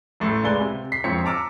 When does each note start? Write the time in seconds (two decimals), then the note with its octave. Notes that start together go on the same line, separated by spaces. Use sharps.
0.20 A1 A2 A4 C6
0.43 C#2 G#3 B4 D5 G#5 G7
0.61 C3
0.92 B6 C7
1.04 E1 F2 F3 C4 C#5 C#7
1.25 A5 A#5 D6 E6 F6